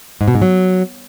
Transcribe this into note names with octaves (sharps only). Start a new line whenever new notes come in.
G#2
B2
G#2
F#3